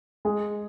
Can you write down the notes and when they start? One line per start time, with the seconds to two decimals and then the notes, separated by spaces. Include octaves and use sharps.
0.25 G#3 G#4